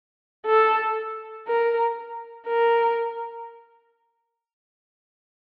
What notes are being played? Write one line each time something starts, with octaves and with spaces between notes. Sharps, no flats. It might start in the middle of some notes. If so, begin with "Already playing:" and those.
A4
A#4
A#4